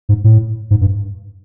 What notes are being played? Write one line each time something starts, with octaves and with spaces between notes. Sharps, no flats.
G#2
A2
G#2
G2